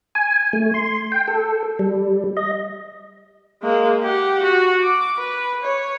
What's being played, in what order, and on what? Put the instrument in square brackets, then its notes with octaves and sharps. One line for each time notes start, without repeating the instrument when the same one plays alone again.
[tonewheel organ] G#5
A3
C6
G5
A4
G3
D#5
[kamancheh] G#3 A#3
G4 F#5
F#4
D6
B4
C#5